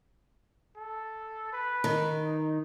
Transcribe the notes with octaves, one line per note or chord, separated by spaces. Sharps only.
A4
B4
D#3
D#4